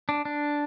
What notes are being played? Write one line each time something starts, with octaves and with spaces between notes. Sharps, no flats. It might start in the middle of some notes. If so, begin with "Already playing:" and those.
D4
D4